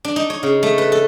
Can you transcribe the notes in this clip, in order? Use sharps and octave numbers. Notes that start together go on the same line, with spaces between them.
D4
D#4
C#5
C#3
A3
B4
A4